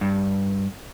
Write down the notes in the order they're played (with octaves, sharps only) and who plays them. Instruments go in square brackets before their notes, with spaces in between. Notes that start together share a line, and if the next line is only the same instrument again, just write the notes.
[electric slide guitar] G2